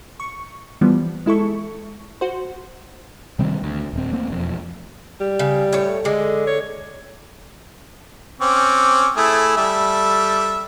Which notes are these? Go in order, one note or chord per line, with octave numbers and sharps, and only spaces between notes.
C#6
E3 F3 G3 B3
G#3 E4 A4 C#6
F#4 C5
C3 D#3 G3 C4
D2
D#1 C4
A3 A#3 C4
E1 F2
G3
C#3
A2 C#5
D3 G#3
C#5
C4 C#4 D6
A3 E4 G#4
G3 A4 E5